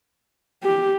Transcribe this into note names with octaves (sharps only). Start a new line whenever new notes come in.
G4